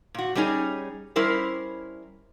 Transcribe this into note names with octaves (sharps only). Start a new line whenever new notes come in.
A#2 F#4
G3 A3 C#4 D#4 G#4
G3 C#4 E4 A#4 C5